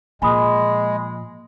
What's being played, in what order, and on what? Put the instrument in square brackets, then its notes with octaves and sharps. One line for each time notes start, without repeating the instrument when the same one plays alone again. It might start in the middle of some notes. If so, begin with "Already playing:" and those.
[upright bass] A#2 F3 [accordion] G#3 [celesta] G#5 B5 D#6